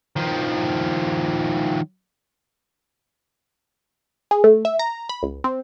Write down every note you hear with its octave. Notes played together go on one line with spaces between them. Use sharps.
D#3 F3
G#4
A3
E5
A#5
B5
C#2
C4